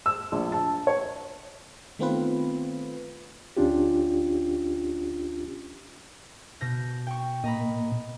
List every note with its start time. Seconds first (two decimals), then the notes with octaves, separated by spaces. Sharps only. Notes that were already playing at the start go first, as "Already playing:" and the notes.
0.06 E6
0.32 A#1
0.52 A5
0.87 C#5
1.99 D#3 A3 B3 C4 F4 B4
3.57 D2 C#4 D4 F4 G4
6.61 B2 G6 A#6
7.07 G5 C#6
7.44 A#2 D#5 A#5 B5